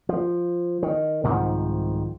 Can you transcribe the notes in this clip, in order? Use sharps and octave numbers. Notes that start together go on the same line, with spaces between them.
F3
D#3
C2 G#2 D#3 F3